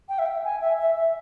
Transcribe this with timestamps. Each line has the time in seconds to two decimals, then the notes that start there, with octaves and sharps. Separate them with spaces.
0.09 G5
0.19 E5
0.26 G5
0.44 G#5
0.61 E5
0.78 E5
0.96 E5